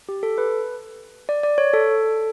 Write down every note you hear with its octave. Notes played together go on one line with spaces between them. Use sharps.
G4
A4
B4
D5
D5
C#5
A4